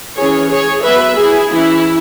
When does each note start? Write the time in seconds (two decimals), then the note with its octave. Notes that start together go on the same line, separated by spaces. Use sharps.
0.18 E3 C#4 G#4 C#5
0.51 G#4 C#5
0.85 F#3 B3 B4 E5
1.19 E4 G#4
1.52 E3 C#4 E4